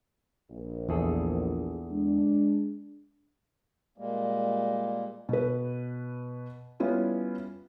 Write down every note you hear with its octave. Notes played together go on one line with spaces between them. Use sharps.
A#1
E2 G#4 A4
G#3 D4
A#2 G3 G#3 A#3
B2 B4
G3 B3 C#4 E4 F4